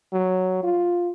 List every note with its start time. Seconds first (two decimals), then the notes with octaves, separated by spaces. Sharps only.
0.13 F#3
0.64 F4